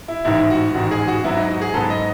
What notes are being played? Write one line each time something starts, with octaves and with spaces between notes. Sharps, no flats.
E4
A1 G#2 D#3 E4
F#4
A1 G#2 D#3 F#4
G#4
F#4
G#2 F#3 B3 E4
D#4
F#4
G#4
G#2 F#3 B3 A4
D#5